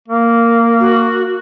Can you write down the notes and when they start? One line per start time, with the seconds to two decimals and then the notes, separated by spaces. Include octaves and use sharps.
0.08 A#3
0.80 F#4